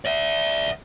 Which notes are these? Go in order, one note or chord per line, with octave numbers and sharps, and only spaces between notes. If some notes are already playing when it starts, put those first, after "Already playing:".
D5 E5